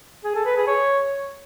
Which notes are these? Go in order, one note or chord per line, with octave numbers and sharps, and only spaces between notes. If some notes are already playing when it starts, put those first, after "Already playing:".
G#4
A4
B4
G#4
C#5